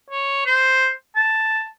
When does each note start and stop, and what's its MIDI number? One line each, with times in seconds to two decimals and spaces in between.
0.10 0.42 73
0.46 0.89 72
1.16 1.67 81